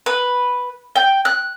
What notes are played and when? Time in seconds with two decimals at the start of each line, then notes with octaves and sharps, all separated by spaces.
0.06 B4
0.96 G5
1.25 F#6